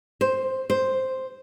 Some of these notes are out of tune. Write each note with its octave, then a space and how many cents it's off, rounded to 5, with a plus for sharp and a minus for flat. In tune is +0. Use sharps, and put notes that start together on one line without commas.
C5 +5
C5 +0